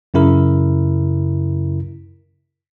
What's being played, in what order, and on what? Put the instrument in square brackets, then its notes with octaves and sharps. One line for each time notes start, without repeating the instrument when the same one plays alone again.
[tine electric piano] F#2 C#3 E4 A#4